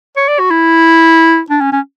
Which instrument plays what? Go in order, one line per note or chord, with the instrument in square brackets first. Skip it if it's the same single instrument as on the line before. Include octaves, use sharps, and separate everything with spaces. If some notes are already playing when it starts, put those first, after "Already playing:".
[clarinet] C#5
D5
F#4
E4
D4
C#4
C#4